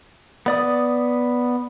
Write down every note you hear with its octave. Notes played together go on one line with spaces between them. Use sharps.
B3 D5 D#6